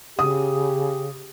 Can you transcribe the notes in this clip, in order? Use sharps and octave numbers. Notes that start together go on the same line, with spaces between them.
C#3 G4 D#6